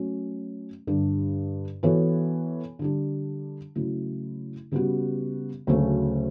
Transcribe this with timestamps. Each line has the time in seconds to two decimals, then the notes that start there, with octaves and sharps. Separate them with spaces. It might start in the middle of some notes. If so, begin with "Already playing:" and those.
Already playing: F#3 A3 C#4
0.87 G2 D3 G3 D4
1.83 E3 B3 F#4 A4 C#5
2.79 D3 G3 D4
3.75 C#3 F#3 A3 E4
4.72 C#3 G3 B3 F#4
5.67 D2 C#3 F#3 A3 C#4